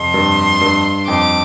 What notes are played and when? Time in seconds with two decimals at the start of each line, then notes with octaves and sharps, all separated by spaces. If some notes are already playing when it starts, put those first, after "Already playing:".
Already playing: F2 C3 C6
0.14 G2
0.61 G2
1.08 F2 D6